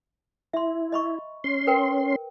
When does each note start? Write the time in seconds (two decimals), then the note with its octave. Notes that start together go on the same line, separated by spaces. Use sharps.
0.53 E4 E5 C6
0.92 D#5 B5 C#6
1.44 C#4 C6
1.67 A#4 B4 G5